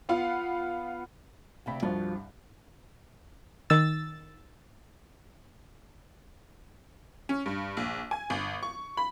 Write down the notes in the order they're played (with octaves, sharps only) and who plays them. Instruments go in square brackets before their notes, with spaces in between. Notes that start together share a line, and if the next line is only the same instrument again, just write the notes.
[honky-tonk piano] B3 F4 F5 F#5
[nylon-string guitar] D2 C3 G5 [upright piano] F5 B5
[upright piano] C2 G2 [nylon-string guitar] F3 F4 F#4
[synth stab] D#3 E6 A6
[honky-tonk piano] C#4
G2
A#1
G#5
G1
C#6
B5